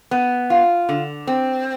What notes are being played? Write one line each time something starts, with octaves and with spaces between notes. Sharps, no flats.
B3
F4
D3
C4